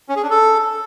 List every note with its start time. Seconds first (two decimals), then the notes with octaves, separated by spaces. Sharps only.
0.09 C#4
0.16 G#4
0.23 D4
0.30 A4